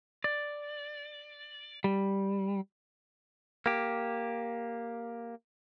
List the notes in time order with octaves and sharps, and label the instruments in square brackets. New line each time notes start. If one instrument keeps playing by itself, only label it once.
[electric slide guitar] D5
G3
[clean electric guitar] A#3 G4